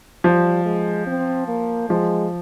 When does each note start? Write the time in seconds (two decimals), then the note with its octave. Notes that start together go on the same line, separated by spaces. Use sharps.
0.24 F3 G3
0.65 G#3
1.07 C4
1.48 A#3
1.89 F3 G#3